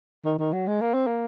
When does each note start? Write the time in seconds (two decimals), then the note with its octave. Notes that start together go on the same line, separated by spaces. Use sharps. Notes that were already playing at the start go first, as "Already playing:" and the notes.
0.25 D#3
0.39 D#3
0.53 F#3
0.67 G#3
0.81 A#3
0.94 C4
1.07 A#3